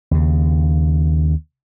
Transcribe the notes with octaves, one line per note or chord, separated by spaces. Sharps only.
D#2 C#3